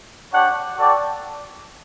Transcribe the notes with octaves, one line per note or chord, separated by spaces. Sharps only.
D4 G4 C#5 F#5
F#4 A4 D5 G5